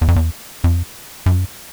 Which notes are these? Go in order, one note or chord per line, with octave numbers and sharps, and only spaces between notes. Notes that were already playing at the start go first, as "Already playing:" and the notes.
E2
F2
E2
F2
F#2